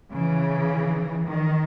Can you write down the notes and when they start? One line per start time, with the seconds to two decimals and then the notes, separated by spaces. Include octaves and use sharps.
0.13 C#3 E3
1.25 D#3